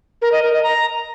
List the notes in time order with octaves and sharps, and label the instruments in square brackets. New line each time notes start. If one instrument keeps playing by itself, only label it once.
[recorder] A#4
D#5
A#4
D#5
A#5